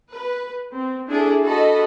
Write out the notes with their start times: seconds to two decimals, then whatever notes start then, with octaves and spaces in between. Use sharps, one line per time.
0.12 B4
0.75 C4
1.08 D4 E4 G#4 A4
1.43 F#4 A4 D#5 A5 B5